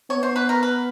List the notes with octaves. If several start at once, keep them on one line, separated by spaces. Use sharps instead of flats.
B3 C#5
C5
B4
A#4
B4